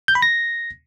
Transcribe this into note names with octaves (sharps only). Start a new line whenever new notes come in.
G6
B5
A#6